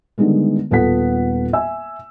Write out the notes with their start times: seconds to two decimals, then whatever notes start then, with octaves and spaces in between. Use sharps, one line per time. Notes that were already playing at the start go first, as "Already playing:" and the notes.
0.18 D3 D#3 G3 G#3 B3
0.71 D#1 B3 F4 A4 F#5 B6
1.53 E5 G#5 E6